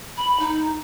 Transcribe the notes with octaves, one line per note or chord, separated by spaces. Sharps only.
B5
D#4